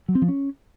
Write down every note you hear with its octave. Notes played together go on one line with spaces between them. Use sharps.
F#3
C4
F3
C#4